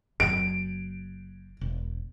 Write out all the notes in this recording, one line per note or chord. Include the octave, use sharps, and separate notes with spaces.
F#1 F#2 D7
E1